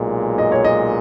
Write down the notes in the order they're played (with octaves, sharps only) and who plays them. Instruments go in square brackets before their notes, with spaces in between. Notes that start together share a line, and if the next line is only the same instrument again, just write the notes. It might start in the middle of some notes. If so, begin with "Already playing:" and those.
Already playing: [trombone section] B1 A#2 G#3
[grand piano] D#5
C#5
D#5